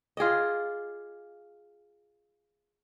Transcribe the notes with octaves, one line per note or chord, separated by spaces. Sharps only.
F4 G#4 D5 D#5